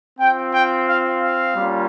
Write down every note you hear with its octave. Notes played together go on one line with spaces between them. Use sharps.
C4 F4 G5
G5
F5
F5
G3 A#3 C#4 F4